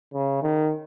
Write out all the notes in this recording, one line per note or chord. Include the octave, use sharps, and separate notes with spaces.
C#3
D#3